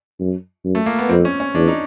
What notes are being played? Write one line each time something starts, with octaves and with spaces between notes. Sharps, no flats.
F#2
F#2
A3
A#3
B3
F2 C4
C#4
C#4
E2 D4
D#4